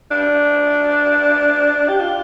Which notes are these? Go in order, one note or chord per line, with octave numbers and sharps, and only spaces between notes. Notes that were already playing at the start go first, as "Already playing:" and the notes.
D4
G4
F4